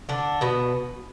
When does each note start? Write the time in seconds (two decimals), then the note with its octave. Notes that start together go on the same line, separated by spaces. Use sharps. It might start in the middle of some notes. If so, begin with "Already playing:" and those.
0.09 D3 D4
0.41 B2 B3